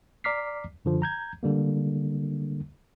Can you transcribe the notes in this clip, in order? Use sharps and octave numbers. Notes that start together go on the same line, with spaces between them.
D5 A#5 D6 F6 B6 C7
F#2 D3 F3
A#5 G6 G#6
D3 G3 A#3